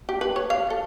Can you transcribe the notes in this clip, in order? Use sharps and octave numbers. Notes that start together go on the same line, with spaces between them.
G4
B4
C#5
F5
A4